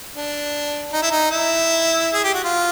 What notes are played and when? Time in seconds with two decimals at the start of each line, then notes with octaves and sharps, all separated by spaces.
0.16 D4
0.93 D#4
1.02 E4
1.11 D#4
1.30 E4
2.14 G#4
2.24 G4
2.34 F#4
2.44 F4